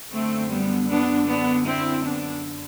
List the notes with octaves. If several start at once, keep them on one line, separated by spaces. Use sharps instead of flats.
F#2 D3 A3 C4
G3 B3
B3 D4
B3 D4
C4 E4
B3 D4